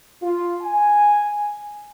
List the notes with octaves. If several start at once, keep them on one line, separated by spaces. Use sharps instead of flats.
F4
G#5